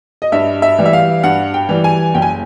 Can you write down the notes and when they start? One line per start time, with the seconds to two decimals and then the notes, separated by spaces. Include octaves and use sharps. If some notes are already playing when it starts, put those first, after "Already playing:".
0.22 D#5
0.32 G2 E5
0.62 E5
0.78 E3 G3
0.86 E5
0.93 F5
1.23 G2 F#5
1.54 G5
1.69 E3 G3
1.84 G#5
2.14 F#1 G5
2.22 G#5